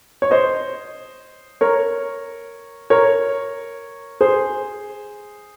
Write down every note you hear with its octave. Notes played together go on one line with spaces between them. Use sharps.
C#5
C5 D#5
A#4 C#5
A#4 C#5
G#4 C5